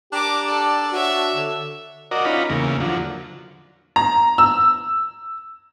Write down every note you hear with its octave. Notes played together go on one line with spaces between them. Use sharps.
D4 G4 A#4 D6
A4 D5
F#4 C#5 E5
D3
F#4 A#4 D5 D#5
C#4 D#4 F4 A#5 B5
E2 C#3 A#3
D3 F3 F#3
A#5
E6